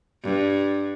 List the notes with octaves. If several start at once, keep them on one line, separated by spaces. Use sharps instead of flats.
G2